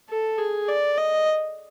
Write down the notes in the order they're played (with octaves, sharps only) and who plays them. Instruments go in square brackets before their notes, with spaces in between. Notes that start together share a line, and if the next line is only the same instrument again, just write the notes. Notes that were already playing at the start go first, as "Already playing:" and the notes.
[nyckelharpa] A4
G#4
D5
D#5